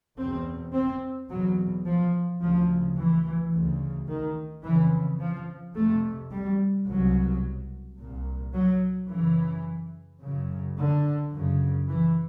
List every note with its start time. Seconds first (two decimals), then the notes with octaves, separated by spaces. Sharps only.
0.18 E2 B2 C4
0.74 C4
1.30 E2 B2 F#3
1.86 F3
2.41 D2 C#3 F3
2.97 E3
3.53 D2 C#3
4.08 D#3
4.64 F2 C#3 E3
5.20 F3
5.75 F2 C3 A3
6.31 G3
6.87 C2 B2 F#3
7.98 C2 A#2
8.54 F#3
9.10 F#2 C#3 E3
10.22 F#2 C#3
10.77 D3
11.33 F#2 C#3
11.88 E3